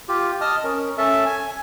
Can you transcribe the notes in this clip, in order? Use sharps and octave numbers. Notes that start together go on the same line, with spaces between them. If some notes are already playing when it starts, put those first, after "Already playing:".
F4 G4
D#5 A5 D#6 F6
C#4 A#4
C#4 A4 E5 A5
G#5